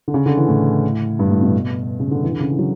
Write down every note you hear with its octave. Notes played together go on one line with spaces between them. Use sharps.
D3
C#3
D3
E3
A2
G2
A2
B2
C#3
D3
E3
D3
C#3
E3
F#3